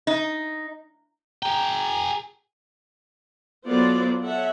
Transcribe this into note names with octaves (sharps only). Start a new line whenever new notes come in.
D#4
G#4 G5 A#5
F#3 B3 F4 A4 C5 D5
A4 C#5 E5 F#5